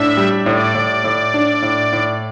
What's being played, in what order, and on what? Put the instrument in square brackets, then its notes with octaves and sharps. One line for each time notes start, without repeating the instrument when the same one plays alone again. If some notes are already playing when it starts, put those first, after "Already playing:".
Already playing: [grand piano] A2 D4 [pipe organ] E5
[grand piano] G3
[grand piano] A2 [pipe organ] D5
[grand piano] A2
A2
D4
A2
A2